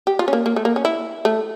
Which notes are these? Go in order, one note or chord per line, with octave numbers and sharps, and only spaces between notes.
G4
F4
C#4
A#3
A#3
A3
A#3
C#4
E4
A3